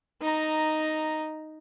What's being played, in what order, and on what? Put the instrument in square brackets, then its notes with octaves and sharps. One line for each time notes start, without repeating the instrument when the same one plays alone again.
[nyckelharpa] D#4 A#5